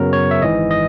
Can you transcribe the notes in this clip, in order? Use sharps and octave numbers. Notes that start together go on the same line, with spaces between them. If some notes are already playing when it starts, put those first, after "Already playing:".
Already playing: F#2 C#3 F#3 B3 A#4
C#5
E5
G#1 G#2 E3 D#5
D#5